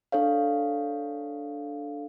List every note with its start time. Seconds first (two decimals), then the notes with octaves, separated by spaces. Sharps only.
0.12 D4 A4 C#5 F5